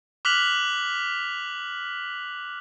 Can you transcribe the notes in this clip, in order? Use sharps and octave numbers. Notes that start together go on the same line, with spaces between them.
D6 F6 F#6 B6 F7 F#7